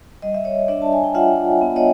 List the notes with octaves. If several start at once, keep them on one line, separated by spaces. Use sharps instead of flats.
G3 D#5
E5
C#5 D#5
D4 D5 E5
A5
G#5
G5
F4 E5 F#5
B3
C#5 D#5